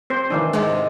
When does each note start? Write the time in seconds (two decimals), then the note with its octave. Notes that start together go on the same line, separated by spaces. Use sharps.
0.10 C4 C5
0.30 D#3 E3 D4
0.53 G#2 C3 D#3 G#3